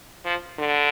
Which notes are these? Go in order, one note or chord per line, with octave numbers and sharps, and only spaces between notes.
F3
D3